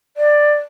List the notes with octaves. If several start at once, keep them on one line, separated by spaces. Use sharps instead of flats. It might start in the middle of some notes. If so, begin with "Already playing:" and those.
D5